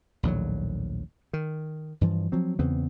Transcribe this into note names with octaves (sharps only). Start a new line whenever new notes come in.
A#1 D#2 A2 F#3
D#3
G2 E3 F3
F3 F#3 C4
E2 C#3 B3 C4